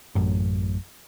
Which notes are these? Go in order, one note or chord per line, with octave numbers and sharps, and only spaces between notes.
A1 F#2 A2